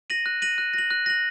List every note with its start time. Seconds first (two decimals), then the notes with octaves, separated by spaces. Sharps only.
0.10 A#6 D#7 F#7
0.26 F#6
0.42 A#6 D#7 F#7
0.58 F#6
0.74 A#6 F#7
0.90 F#6
1.06 A#6 F#7